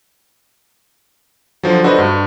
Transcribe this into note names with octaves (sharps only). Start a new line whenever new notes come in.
D3 F3 F#3
D4 F#4 A4 B4 C5 D#5
G2